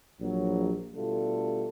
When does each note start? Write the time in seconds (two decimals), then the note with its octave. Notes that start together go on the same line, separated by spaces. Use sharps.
0.21 A#1 F#3
0.95 B2 D3 G3 A3 F4 A4